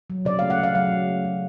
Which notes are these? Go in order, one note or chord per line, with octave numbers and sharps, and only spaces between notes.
F#3
C#3 D5
A3 F5
F#5
C#3 F5
F#3 F5
C#3
A3
C#3